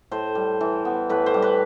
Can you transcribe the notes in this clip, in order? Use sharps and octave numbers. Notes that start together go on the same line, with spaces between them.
A2 C5
G3
E3
B3
A2 B4
C5
G3
B4